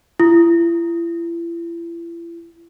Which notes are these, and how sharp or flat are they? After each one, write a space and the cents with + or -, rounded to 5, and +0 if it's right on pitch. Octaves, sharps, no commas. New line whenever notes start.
E4 +40